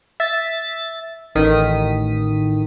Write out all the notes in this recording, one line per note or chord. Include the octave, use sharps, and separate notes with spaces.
E5 A6
A1 D#3 D#6 B6